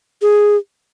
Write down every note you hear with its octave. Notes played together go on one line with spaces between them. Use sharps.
G#4